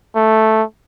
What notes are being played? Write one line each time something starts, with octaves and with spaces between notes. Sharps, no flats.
A3